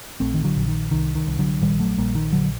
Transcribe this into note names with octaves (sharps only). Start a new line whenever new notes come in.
A#1 A3 C4
D#3
D3 F#3
A#1
D#3
C2 D#3
D#3
C2
D3 F#3
A#1 D#3 G3
F#3 A3
A#1 G3 A#3
D#3
A#1 D3 F#3